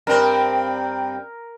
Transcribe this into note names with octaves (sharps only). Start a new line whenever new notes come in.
G2 C4 A#4